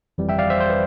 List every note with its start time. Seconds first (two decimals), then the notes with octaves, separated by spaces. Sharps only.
0.18 G1 F2 E3 G3
0.29 E5 G5
0.38 D5 F5
0.50 C5 E5
0.60 C5
0.70 B4